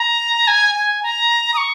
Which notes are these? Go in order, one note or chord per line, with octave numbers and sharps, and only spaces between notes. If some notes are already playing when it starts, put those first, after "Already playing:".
Already playing: A#5
G#5
G#5
A#5
D#6
C#6